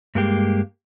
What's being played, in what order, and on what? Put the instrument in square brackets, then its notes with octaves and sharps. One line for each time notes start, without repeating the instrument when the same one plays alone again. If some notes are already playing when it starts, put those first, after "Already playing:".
[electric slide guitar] G2 G#3 A#3 G4